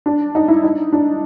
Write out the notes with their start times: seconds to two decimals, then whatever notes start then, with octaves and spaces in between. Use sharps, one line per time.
0.06 D4
0.35 D#4
0.48 E4
0.64 D#4
0.93 D4